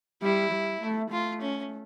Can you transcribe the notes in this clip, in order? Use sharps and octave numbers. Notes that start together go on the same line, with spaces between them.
G3 E4
G3
A3
A3 F4
C#4